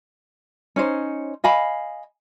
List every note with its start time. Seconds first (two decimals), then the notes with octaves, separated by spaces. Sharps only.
0.76 C#4 D#4 C5
1.44 D#5 F5 G#5 B5